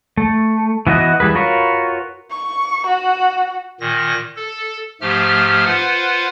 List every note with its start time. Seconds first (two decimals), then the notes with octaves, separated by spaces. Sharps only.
0.17 A3
0.87 E3 B3 F#4 D#5 F#6
1.20 E3 G3 G#4 B4
1.35 F4 F#4 A#4 B4 C#5
2.30 C#6
2.87 F#4
3.80 A#2 D#3 A#6
4.36 A4
5.01 G#2 F3 A3 G4 F6
5.65 F4 B4 C5 F#5